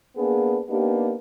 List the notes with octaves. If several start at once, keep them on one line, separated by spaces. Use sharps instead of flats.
A#3 B3 D4 G#4
A#3 B3 D4 D#4 G4